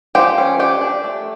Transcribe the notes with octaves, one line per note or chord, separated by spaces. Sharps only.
F3 G4 G5
C#4
D4 G4 G5
D4
A3